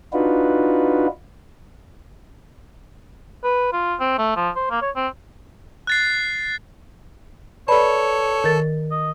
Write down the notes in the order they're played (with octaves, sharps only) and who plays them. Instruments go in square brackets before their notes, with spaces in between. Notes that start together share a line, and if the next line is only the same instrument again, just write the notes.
[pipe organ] D4 D#4 F4 F#4 B4
[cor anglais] B4
F4
C4
A3
F3
C5
A#3
C#5
C4
[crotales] F#6 A6 C7
[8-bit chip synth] A4 A5 [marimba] B4 D5 B5 [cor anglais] C#5
[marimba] D#3 A#4 A6
[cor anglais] D#5